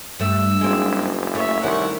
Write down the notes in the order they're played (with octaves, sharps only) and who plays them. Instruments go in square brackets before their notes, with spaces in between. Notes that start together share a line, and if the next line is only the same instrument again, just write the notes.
[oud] G2 A3 [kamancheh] E6
[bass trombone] F#1 [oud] G#3 C4
[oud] A3 [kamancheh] C#5 E5
[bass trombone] C2 [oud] D#3 C#4 E4 [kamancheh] F#5 C#6